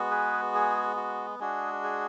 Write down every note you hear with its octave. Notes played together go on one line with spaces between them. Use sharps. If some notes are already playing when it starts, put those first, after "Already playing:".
Already playing: G#3 B3 F#4
G#4 B4
G#4
F#4
G#3 D4 F#4 G#4
G#4